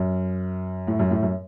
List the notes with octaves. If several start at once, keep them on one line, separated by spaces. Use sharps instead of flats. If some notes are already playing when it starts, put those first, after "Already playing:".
Already playing: F#2
A2
F#2
A2
F#2